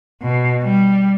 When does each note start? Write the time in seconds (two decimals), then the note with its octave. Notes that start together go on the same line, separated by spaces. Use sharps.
0.21 B2
0.63 G3